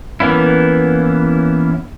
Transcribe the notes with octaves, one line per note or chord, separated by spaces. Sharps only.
E3 A#3 B3 C#4 E4